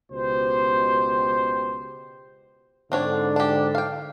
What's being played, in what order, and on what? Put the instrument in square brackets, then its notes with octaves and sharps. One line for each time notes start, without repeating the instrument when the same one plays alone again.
[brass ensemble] C#2 B2 G4 C5
[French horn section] G#2 D3 [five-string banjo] C4 D4 C#5
[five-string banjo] D4 G4
F5 G5